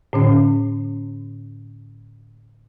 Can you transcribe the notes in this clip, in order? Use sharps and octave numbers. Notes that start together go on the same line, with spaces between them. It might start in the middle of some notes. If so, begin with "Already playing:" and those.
A2 D3 C#4